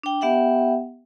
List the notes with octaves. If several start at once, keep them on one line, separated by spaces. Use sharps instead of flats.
D4 G5
B3 G4 E5 F#5 G5